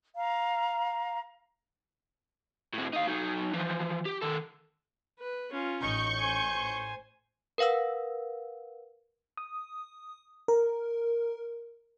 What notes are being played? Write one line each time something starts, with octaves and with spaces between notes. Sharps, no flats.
F5 A#5
A2 C4
D#4 F5
F#3 D#4
E3 F3
G4
D#3 A4
B4
C#4 F4
A1 D#4 C#6 G6
C5 G#5
A#4 B4 F5 F#5 E6
D#6
A#4